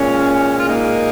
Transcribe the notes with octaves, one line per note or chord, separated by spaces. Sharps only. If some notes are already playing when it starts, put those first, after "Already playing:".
Already playing: A#2 G#3 C#4
F4
A#3 D#4